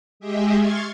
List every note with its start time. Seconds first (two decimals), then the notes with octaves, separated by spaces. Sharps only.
0.20 G#3 G4 G#4 D#5 E5
0.56 C6 C#6 F6 G#6 A6